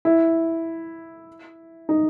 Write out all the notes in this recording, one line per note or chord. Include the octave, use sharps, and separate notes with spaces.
E4
D#4